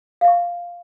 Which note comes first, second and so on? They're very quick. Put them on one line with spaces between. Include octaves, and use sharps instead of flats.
F5 E5 C#6